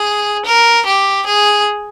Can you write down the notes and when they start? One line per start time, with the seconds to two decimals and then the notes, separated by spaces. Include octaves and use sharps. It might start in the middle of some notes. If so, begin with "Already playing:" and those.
Already playing: G#4
0.46 A#4
0.86 G4
1.26 G#4